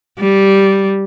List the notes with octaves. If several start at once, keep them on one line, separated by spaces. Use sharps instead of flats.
G3